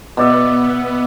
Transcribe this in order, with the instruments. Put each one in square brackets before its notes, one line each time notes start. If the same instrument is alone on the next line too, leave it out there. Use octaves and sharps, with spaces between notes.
[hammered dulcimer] B2 D5 E5 [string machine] B3